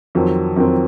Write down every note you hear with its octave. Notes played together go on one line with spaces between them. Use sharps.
F2 D#3 F#3 C4
F2 D#3 F#3 C4